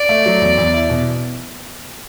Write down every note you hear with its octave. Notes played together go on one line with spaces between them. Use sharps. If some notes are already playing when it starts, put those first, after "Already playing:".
Already playing: D5
A3
F#3
E2
E2
E4
B2